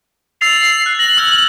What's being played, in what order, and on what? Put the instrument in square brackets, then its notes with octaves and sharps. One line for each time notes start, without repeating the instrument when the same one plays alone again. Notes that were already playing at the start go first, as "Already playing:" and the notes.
[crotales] E6 A6 F7 [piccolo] C7
[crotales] F#6
[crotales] A#6 [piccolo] F#7
[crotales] E6 F6 G#6